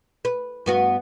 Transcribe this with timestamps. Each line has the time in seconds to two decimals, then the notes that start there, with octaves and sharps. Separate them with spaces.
0.25 B4
0.66 G2 B3 F#4